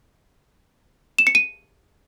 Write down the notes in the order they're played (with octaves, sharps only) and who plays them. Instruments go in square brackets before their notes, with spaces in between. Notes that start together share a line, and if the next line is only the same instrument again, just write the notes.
[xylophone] E7
C#7
D#7